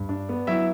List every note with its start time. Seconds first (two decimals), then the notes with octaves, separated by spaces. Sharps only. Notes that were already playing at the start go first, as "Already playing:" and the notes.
Already playing: G2
0.09 D4
0.29 B3
0.47 F#3 E4 E5